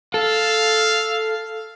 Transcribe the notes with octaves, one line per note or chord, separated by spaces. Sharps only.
A4 F5